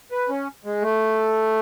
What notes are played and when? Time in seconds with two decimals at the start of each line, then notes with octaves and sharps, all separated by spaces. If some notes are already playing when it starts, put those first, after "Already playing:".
0.11 B4
0.29 C#4
0.65 G#3
0.82 A3